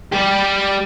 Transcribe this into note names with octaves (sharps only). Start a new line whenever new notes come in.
G3 G4